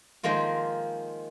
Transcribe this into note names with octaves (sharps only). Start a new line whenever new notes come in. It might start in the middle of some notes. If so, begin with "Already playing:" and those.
D#3 F3 G#3 A#3 F4